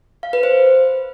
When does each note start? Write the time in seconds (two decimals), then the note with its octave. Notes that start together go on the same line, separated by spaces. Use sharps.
0.23 F5
0.33 B4
0.43 C5